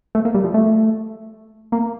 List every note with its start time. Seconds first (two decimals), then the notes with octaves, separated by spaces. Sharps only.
0.15 A3
0.25 A#3
0.35 G3
0.44 F3
0.54 A3
1.72 A#3